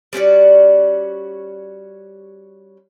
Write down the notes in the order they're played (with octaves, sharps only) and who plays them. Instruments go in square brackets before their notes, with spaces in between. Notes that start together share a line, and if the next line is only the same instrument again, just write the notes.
[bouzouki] G3 C#4 F#4 D5